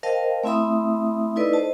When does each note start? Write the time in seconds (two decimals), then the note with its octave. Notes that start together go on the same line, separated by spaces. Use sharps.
0.03 A#4 C5 D#5 F5 G5 A5
0.43 A3 C4 E4 E5 B5 D#6
1.36 D#4 E4 A4 B4 D5 D#5
1.53 C5 D#5 A5